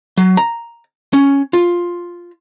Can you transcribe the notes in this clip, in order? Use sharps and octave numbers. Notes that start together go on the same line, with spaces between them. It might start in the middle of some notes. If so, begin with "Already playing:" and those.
F#3
A#5
C#4
F4